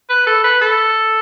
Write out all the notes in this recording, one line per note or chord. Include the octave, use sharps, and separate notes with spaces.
B4
A4
B4
A4